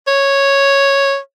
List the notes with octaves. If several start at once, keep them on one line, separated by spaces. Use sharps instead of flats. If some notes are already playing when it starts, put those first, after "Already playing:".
C#5